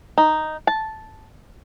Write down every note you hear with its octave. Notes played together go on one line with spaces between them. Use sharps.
D#4
A5